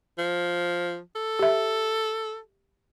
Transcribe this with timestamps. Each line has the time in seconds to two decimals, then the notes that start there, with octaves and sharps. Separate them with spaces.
0.18 F3
1.16 A4
1.39 G4 E5